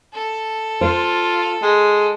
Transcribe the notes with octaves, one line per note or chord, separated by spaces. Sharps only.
A4
F4 C5
G#3